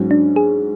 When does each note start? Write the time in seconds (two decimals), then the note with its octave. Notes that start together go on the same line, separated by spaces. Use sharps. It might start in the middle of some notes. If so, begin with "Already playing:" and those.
Already playing: G#2 F#3 C#4
0.11 D4
0.36 G#4